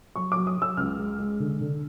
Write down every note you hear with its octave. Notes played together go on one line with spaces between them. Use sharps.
F#3 C#6
F#3 D6
D#6
F#3
E6
C#2 F6
G#3
G#3
D3
D3